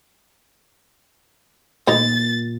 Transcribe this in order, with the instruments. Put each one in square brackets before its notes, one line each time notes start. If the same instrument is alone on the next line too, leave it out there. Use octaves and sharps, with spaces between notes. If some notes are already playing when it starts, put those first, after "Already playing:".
[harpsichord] D2 D#4 A#5 [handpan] A#2 [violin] A6